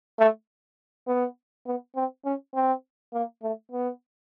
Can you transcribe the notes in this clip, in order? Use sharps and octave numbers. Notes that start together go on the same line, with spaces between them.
A3
B3
B3
C4
C#4
C4
A#3
A3
B3